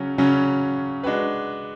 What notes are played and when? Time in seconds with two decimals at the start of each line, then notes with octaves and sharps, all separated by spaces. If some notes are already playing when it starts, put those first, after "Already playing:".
Already playing: C#3 F#3 C#4
0.18 C#3 F#3 C#4
1.03 G#3 D4 F#4 B4